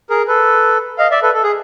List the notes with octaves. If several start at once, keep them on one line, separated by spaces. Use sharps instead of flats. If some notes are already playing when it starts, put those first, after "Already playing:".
G#4 A#4
A4 B4
D#5 F5
D5 E5
A4 B4
A4
G#4